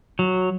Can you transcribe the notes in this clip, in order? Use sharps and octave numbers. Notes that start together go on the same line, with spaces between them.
F#3